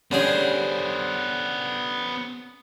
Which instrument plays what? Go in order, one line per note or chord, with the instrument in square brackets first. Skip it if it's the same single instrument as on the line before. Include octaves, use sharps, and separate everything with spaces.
[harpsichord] D3 G3 G#4 [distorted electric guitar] B3 C5 [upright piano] C#4